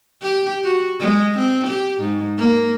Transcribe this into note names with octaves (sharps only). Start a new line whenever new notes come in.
G4
F#4
G#3
C4
G4
G#2
A#3